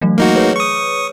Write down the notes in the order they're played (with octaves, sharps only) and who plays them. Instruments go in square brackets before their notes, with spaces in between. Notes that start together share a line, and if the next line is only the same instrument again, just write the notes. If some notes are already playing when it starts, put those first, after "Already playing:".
[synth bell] E3 F#3 A3
[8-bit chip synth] A#3 D#4 F#4
[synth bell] G#4 B4 C#5
[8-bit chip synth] C#6 D#6